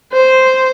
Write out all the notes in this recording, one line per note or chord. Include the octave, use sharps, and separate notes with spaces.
C5